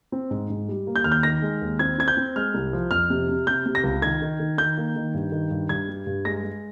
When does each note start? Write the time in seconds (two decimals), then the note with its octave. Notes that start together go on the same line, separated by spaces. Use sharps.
0.12 C4
0.31 G#2
0.50 G#2
0.69 G3
0.87 A#3
0.96 G6
1.04 D#2 F6
1.12 G6
1.23 D#3 A#6
1.42 G#3
1.62 D#2
1.79 C4 G#6
1.98 C4 G#6
2.08 G6
2.17 C4
2.36 G#3 F6
2.54 C2
2.73 F3
2.91 F2 F6
3.10 C3
3.28 C3
3.47 C3 G6
3.66 C3
3.75 A#6
3.84 C#2
4.02 D#3 G#6
4.22 D#3
4.40 D#3
4.58 D#3 G6
4.77 A#3
4.96 D#3
5.14 G2
5.32 D#3
5.51 G2
5.69 G2 G#6
5.88 G3
6.07 G2
6.25 G#3 A#6
6.43 G#3